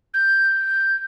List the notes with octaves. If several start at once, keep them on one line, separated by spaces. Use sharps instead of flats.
G6